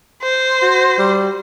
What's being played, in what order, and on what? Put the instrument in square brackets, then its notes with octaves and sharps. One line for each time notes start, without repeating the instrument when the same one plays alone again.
[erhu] C5
[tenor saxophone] F#4
G3